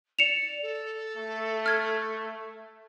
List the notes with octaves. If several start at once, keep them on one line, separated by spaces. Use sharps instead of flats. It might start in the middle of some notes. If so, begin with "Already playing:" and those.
D5 C#7 E7 F7
A4
A3
F6 G#6